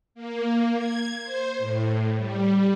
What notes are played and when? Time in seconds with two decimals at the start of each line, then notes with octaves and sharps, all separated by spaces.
0.15 A#3
0.75 G#6
1.23 C5
1.58 A2
2.17 G3